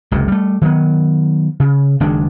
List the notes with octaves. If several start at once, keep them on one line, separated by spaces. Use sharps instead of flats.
F#1 C#2 C3
G3 A3
D#3 F#3 B3
C#3
F#1 D#3 G#3 D4